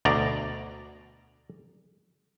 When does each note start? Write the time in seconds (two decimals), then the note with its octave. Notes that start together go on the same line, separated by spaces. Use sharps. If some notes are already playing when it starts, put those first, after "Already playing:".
0.05 D2 B2 D5 A#5